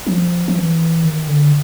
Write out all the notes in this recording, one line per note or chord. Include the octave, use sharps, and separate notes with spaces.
F#3
F3
F3
E3
D#3
D3